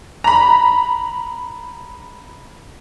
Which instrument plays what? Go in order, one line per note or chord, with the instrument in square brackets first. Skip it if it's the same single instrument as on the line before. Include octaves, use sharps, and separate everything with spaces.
[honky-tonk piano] A#5 B5